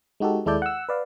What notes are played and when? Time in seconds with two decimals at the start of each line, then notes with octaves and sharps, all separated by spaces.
0.20 G#3 D#4 F#4 G4 A4
0.46 D#2 G#3 E4 A4 D5 G6
0.62 F#5 E6
0.89 B4 D5 F5